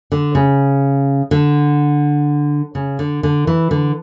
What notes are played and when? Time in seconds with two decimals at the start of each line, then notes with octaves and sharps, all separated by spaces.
0.12 D3
0.35 C#3
1.31 D3
2.75 C#3
2.99 D3
3.23 D3
3.47 E3
3.71 D3